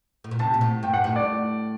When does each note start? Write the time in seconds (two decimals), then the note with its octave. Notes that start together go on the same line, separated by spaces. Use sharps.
0.24 A2
0.31 A#2
0.39 C3 A5
0.54 A#2
0.61 A2
0.83 G2 G5
0.94 F#5
1.04 A2 F#5
1.16 D5